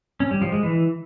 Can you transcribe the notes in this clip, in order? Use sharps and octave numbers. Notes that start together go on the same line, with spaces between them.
C#4
G3
F3
G#3
E3